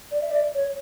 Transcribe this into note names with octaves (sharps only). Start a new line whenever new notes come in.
D5
E5
D5
C#5